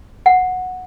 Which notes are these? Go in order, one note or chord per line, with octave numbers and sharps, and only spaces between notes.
F#5